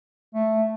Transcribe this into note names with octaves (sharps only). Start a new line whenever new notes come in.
A3